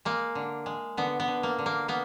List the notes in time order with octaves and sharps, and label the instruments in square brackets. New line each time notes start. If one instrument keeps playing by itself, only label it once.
[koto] G#3 A#3
D3
G#3
D3 B3
B3
D3
A#3
D3
A#3
A#3 B3